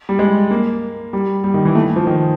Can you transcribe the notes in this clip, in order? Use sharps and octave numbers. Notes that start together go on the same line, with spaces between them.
G3
G#3
A#3
G3
G3
D#3
E3
A3
F3
D#3